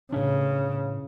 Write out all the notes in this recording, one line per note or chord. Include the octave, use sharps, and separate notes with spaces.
A2 C#3 C#4 D4